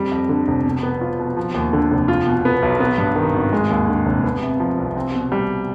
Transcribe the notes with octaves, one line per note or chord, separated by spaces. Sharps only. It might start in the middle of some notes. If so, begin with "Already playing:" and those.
Already playing: F2 G3
F2
D3
F1
B2
B3
F4
B2
F3
D#2
D3
F1
F4
B2
B3
B1
B3
G2
D#3
G#1
G#3
D#2
D3
F1
B3
C3
F3
C2
C4
B2
G3